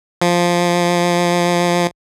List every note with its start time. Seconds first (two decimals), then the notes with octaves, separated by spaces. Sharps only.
0.22 F3